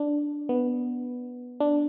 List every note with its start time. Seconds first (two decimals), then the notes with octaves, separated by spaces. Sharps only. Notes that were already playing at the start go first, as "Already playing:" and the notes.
Already playing: D4
0.49 B3
1.60 D4